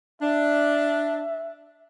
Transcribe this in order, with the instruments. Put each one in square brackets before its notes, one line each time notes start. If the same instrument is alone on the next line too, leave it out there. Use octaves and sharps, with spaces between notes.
[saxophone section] D4 [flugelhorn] E5